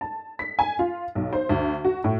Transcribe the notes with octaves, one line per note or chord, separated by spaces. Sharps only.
A5
B6
G#5
F4
B1
C5
D2
F#4
A2